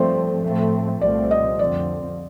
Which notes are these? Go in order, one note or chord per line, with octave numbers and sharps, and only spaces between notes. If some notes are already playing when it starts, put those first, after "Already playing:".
Already playing: G2 F3 A3 C4 C5 D5
A2 F3 A3 C4
C2 A#2 F3 A3 C4 D5
D#5
F2 D3 F3 C4 D5